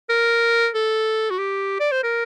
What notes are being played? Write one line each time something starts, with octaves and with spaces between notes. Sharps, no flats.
A#4
A4
F#4
G4
D5
C5
A#4